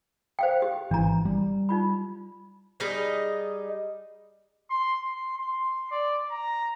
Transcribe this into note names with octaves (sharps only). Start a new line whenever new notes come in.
C5 F5 G5
G4
G#1 E3 D4 E4 A#5
G3
D#4 F4 B5
G3 D#4 G#4 D#5
C6
C6
C6
D5
A#5